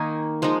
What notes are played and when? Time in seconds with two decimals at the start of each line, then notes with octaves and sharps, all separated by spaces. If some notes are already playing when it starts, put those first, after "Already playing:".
Already playing: D#3 A#3 D#4 G#5
0.42 F3 G#3 D#4